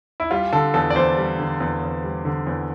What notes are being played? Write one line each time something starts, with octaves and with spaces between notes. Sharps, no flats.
E4
G3 F4
D3 A4
E2 A4
D5
E2 C5
G3
D3
E2
E2
G3
D3
E2